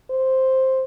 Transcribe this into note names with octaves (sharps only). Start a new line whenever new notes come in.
C5